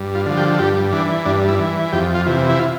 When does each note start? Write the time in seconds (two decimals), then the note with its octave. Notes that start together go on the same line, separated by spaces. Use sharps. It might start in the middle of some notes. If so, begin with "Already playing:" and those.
Already playing: G2
0.15 F4
0.26 D3 F3
0.37 G4
0.54 A4
0.59 G2 G4
0.93 E3 D4
1.25 G2 D4
1.48 E4
1.59 E3
1.92 F2 G4
2.15 F4
2.26 C3 E3
2.50 E4
2.59 F4